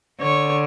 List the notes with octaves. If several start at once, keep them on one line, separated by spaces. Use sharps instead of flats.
D3 C#5